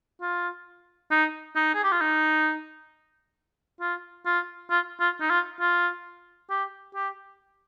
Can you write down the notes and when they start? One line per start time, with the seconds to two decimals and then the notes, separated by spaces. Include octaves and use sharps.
0.21 F4
1.11 D#4
1.56 D#4
1.74 G#4
1.84 G4
1.92 F4
2.01 D#4
3.81 F4
4.26 F4
4.70 F4
5.00 F4
5.21 D#4
5.30 F4
5.60 F4
6.50 G4
6.95 G4